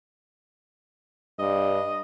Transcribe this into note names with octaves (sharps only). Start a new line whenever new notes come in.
G2 D#5